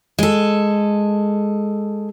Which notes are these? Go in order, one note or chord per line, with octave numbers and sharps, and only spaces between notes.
G#3 A4